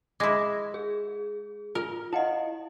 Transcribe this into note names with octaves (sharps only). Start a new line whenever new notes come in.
G#3 E4 D6 G#6 A#6
G#4
F4 A#4
E4 D#5 F5 F#5 A5